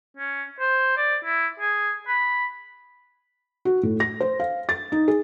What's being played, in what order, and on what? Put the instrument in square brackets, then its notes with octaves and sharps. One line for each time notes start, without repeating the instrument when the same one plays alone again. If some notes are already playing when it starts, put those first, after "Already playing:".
[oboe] C#4
C5
D5
E4
G#4
B5
[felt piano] F#4
A2
A#6
C5
F5
A6
D#4
G#4